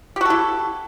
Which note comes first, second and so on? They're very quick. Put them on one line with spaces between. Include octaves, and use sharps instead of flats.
G4 F#4 A4 E4